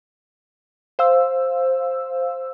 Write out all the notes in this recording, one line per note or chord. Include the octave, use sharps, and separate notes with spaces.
C5 F5 E6